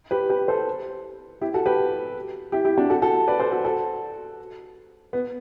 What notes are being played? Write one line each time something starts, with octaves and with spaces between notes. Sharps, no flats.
G4 B4
G4 B4
A4 C5
E4 G4
F#4 A4
G4 B4
E4 G4
E4 G4
D4 F#4
F#4 A4
F#4 A4
B4 D5
A4 C5
F#4 A4
F#4 A4
B3